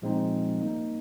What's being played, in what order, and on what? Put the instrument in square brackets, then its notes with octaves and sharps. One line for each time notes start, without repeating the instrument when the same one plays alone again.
[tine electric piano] A#2 F3 G#3 C4 D#4
G3 A#3 D#4